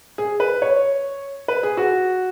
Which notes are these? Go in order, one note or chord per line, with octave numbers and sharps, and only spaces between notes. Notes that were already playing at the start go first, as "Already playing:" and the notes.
G#4
B4
C#5
B4
G#4
F#4